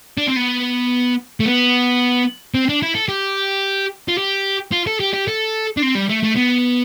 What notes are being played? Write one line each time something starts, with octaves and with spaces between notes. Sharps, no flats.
D4
C4
B3
A3
B3
C4
D4
E4
A4
G4
F4
G4
F4
A4
G4
G4
A4
D4
C4
G3
A3
A3
B3